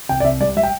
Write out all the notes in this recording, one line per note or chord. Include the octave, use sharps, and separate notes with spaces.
C2 G5
D5
C2 E5
G3 D5
G3 E5
G5